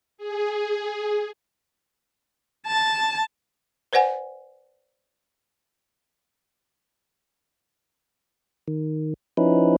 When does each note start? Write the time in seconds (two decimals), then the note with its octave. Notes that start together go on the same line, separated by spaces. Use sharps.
0.18 G#4
2.67 A5
3.93 B4 C5 D5 F#5 G#5
8.68 D#3
9.37 F3 C#4 D#4 E4 B4